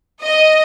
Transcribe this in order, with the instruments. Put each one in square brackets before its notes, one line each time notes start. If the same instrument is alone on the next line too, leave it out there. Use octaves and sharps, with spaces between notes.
[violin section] D#5